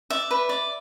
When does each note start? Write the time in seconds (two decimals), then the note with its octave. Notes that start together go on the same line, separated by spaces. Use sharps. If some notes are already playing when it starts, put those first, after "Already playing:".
0.10 D5 E5
0.31 B4
0.49 D5